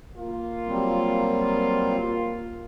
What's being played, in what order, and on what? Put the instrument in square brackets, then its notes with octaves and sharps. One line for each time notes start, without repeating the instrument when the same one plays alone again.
[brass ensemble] A#3 F4
[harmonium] F#3 G3 C4